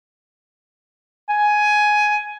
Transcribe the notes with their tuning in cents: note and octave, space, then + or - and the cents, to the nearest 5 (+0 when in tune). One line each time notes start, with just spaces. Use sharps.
G#5 +10